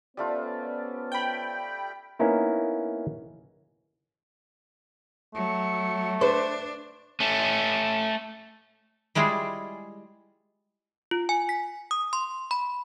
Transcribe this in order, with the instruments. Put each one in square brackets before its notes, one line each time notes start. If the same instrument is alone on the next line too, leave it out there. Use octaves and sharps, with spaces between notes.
[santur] G3 A3 F4 [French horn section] B3 C#4 C5
[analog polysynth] G5 B5
[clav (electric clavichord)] A#3 B3 C#4 D#4 E4 A#4
[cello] F#3 [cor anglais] A3
[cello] D4 [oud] B4 C5
[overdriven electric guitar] A3 C#4
[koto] G3 G#3 E4 F4 G#4
[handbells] F4
G#5
B6
D#6
C6
B5